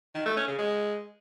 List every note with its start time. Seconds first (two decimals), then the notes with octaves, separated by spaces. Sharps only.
0.15 D#3
0.26 A3
0.37 C#4
0.48 C#3
0.58 G#3